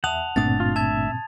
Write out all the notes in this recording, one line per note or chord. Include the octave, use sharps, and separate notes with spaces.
E2 E5 F#5 A5 D#6 F7
G1 G2 A#2 A3 C4 D4 D#6 A6
F4
E5 A5 G#6